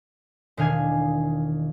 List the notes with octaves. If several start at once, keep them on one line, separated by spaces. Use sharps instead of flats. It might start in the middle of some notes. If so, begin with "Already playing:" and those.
E1 D#3 D4 F5 G#5 G#6